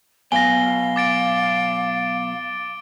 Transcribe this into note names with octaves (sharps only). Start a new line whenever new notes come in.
B2 F#3 B3 F5 G#5 A#6 G7
D6 A6 D7